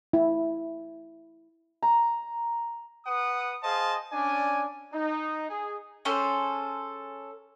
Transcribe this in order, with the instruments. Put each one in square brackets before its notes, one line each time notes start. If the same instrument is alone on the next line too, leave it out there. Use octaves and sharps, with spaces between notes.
[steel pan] E4
[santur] A#5
[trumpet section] B4 F#5 D#6
G#4 C5 D#5 F5 A5
C#4 D4 D5 G#5
D#4
G#4
[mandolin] C#4 G#4 A4 C5